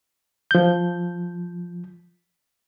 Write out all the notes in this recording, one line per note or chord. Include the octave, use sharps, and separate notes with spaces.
F3 G6